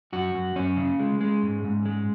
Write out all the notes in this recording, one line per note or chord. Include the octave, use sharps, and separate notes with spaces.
F#2 F#4
F#2
F#2 C#4
C#3
G#3
G#3
G#2
G#2
G#3